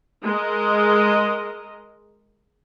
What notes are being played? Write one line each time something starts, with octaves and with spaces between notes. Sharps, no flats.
G#3 A#4 D#5